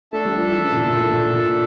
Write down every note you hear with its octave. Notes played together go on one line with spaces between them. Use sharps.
A3 D4 A4 E5 A5
G3
F3
E3
C#3
A#2
A#2
A2
A#2
A#2